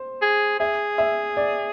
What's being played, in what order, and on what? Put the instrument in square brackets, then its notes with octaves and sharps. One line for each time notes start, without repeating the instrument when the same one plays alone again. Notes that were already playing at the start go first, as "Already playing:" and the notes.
Already playing: [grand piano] C5
[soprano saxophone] G#4
[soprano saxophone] G#4 [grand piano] E5
[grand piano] E5
D5